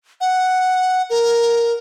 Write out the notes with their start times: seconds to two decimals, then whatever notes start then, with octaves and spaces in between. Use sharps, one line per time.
0.20 F#5
1.10 A#4